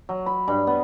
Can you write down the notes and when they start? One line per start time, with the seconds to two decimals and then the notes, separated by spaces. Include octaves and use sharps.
0.09 F#3
0.26 B5
0.48 G2
0.67 B3